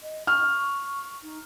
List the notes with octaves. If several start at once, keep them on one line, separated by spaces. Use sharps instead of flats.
D#5
C#6 F6
D#4